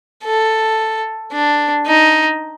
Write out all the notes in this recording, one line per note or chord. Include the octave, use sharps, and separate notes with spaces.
A4
D4
D#4